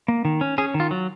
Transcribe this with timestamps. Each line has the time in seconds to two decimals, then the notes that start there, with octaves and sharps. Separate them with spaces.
0.08 A#3
0.25 D#3
0.41 C#4
0.58 C#4 G#4
0.74 D#3
0.80 F4
0.91 F#3